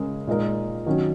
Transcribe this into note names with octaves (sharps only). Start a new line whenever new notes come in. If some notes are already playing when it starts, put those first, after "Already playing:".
Already playing: C#3 G#3 C#4 A#4
A#2 G#3 D#4 A#4
D#3 F#3 C#4